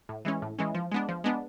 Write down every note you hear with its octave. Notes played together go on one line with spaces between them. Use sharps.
A2
E3 G#3 C#4
A2
E3 G#3 C#4
F3
G#3 B3 D4
F3
G#3 B3 D4